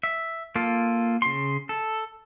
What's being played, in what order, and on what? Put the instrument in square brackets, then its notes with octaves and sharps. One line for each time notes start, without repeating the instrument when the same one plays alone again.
[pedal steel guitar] E5
A#3 F4 A4
C#3 C6
A4